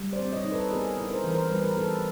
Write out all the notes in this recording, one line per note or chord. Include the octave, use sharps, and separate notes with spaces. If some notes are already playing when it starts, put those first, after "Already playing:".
Already playing: G3
C5 D5
C4
C#5 D#5
D#4
A4 B4
B3 G#4 A#4
E4
A#4 C5
E3
A#4 C5
G3 B4
A#4
B3 A4 B4